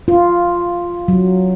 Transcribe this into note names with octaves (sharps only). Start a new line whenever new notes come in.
F4
F#3